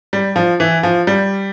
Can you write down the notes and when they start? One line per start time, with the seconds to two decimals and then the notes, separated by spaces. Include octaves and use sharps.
0.13 G3
0.36 F3
0.60 E3
0.83 F3
1.07 G3